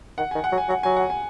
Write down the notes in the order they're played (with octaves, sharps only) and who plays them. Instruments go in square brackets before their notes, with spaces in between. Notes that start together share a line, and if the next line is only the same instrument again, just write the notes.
[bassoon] D#3 [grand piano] F#5
[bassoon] D#3 [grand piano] G#5
[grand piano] F#5
[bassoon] F#3
[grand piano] G#5
[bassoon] F#3 [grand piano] F#5
[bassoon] F#3 [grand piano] G#5
[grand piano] F#5
G#5